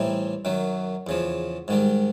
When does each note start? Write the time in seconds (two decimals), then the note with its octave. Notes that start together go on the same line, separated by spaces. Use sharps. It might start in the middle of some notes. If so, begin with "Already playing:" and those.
Already playing: A2 E3 G3 C4 D#4
0.45 F#2 D#3 F#3
1.07 E2 C#3 F3
1.68 G#2 D#3 G3